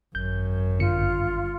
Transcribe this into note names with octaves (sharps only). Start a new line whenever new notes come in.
G#1 F#2 G6
G1 F4 C#7